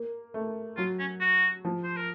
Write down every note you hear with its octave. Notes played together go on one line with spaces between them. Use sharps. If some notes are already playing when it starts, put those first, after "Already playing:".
Already playing: A#3
A3
F#3 F4
C#4
F#4
F3
C5
A#4